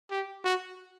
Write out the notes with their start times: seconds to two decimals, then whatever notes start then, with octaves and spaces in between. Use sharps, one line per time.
0.11 G4
0.44 F#4